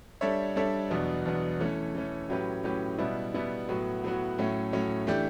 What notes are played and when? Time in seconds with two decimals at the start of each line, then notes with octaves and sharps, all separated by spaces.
0.21 G3 D4 A4 C#5 E5
0.56 G3 D4 A4 C#5 E5
0.90 E2 B2 F#3 B3 D4
1.25 E2 B2 F#3 B3 D4
1.60 E3 A3 C#4
1.95 E3 A3 C#4
2.29 A2 F#3 C#4 G4 B4
2.64 A2 F#3 C#4 G4 B4
2.98 B2 G3 B3 E4
3.34 B2 G3 B3 E4
3.69 A2 F#3 B3 F#4
4.04 A2 F#3 B3 F#4
4.38 A2 F#3 A3 C#4
4.73 A2 F#3 A3 C#4
5.07 E3 A3 D4 G4